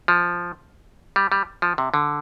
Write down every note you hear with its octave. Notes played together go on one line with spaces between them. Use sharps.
F3
G3
G3
F3
C3
D3